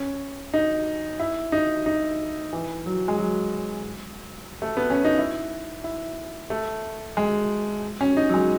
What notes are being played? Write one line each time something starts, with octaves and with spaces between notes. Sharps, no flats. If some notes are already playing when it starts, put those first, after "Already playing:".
Already playing: C#4
D#4
E4
D#4
D#4
E3
F#3
G#3
F#3
A3
B3
C#4
D#4
E4
E4
A3
G#3
C#4
D#4
F#3
G#3